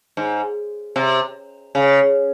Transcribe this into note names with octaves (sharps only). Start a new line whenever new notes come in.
G#2
C3
C#3